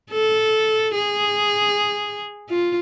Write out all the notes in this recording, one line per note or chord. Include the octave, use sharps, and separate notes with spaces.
A4
G#4
F4